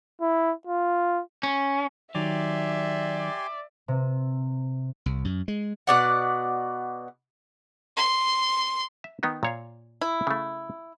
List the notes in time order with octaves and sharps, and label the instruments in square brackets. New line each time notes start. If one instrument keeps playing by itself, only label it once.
[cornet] E4
F4
[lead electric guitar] C#4
[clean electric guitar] D#3 F#3 [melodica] G4 G#5 C6 [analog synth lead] D5 [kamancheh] E5
[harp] C3
[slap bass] C2
F#2
G#3
[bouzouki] B2 D5 F#5
[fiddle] C6
[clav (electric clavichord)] E5
D#3 B3 D#4
A#2 C#5 F5
[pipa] E4
[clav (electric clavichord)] C#3 A3